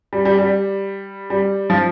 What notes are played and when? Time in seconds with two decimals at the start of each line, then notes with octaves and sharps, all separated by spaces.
0.13 G3
0.25 G3
0.39 G3
1.30 G3
1.70 F3